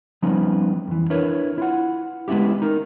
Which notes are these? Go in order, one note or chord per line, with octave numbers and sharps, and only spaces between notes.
F3 G3 B3 C#4 D#4
F2 E3
D4 E4 A#4 B4 C#5
E4 F4 F#5
G#3 B3 C#4 E4 G4
D#4 A#4